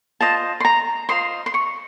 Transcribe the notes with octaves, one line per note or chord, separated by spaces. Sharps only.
F4 C5 D#5 A5
C6
A#5
F4 C5 D#5 C6
C6
C#6